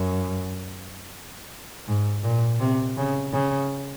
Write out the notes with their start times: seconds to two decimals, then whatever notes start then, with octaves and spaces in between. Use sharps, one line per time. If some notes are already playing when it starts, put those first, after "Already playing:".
Already playing: F#2
1.88 G#2
2.24 A#2
2.60 C3
2.97 C#3
3.33 C#3